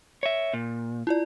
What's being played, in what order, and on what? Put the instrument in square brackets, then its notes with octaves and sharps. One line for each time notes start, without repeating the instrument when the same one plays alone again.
[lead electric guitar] C#5 E5
A#2
[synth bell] E4 F4 D5